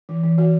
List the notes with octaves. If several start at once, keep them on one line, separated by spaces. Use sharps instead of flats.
E3
E3
E3 F#4